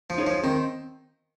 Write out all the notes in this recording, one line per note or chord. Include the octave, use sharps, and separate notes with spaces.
F3
D#4 G#4 C#5
F3
D#3 C4